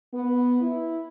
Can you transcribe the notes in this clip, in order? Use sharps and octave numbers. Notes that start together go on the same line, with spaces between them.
B3
E4